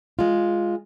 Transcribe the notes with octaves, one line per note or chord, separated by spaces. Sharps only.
G#3 F4